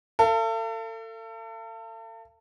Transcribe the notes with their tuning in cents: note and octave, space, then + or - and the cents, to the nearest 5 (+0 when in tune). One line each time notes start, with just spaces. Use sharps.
A4 +35 F5 -45